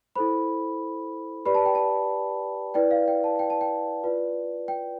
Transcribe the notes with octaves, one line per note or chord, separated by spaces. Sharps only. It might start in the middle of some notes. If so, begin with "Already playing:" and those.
E4 A4 C5 B5
G4 B4 D5 B5
A5
G5
A5
E4 B4 D5 G5
F5
G5
A5
G5
A5
G5
F4 B4 D5
G5